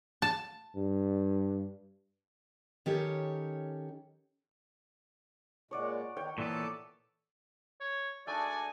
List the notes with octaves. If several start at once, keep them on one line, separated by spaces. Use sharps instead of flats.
A5
G2
D#3 C#4 G4 A4 C#5
A#2 G#3 C#5 D5 F#5
D#3 C#5 G5
A#2 E3 B3 A4 D5 A5
C#5
G#3 A3 D4 D#4 F#4 D5 G#5